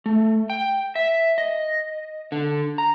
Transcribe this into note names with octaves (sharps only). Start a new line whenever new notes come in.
A3
G5
E5
D#5
D3
A#5